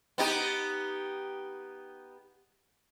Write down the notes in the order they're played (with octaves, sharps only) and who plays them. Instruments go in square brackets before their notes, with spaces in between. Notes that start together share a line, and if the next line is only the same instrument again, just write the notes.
[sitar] B3 D#4 G4